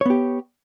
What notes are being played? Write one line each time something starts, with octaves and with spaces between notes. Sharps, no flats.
B3 G4 C#5